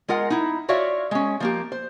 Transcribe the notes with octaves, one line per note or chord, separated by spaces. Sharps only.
G#3 F4 A#4 F#5
D#4 E4
F4 F#4 C#5 D5 E5 F5
G#3 C#4
F3 A#3 G4
C5